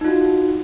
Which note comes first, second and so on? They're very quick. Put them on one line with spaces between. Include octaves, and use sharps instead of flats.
D#4 F4 F#4